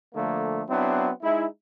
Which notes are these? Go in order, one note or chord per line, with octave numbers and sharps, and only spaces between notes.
D3 F3 A3 A#3
F#3 B3 C4 D4 E4
G#3 D#4 E4